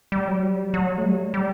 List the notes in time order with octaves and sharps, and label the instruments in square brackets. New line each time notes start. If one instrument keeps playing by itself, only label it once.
[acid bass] G3
F#3
G3
F#3
A3
G3
G3